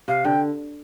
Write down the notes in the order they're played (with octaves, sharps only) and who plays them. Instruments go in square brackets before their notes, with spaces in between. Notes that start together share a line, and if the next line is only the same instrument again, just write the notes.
[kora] C3 [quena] F5
[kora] D3 [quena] G5